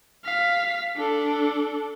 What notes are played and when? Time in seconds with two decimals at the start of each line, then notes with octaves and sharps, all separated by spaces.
0.25 F5 B6
0.96 D4 A4